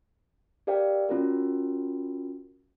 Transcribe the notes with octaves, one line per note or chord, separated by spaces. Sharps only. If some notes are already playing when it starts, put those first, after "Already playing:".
G4 A#4 D5 F5 G5
C#4 F4 F#4 A#4